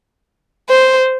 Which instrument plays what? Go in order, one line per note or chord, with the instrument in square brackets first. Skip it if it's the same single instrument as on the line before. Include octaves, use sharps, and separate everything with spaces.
[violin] C5